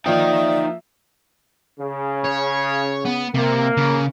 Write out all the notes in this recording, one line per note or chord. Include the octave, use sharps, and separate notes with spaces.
F3 A#3 D#4 F4 D5 E5 G5
C#3
C#5
B3
C3 A#3
C#3